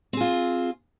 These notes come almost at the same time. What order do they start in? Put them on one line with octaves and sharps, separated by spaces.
C4 G#4 F4